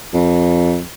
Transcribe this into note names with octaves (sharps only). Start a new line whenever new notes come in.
F2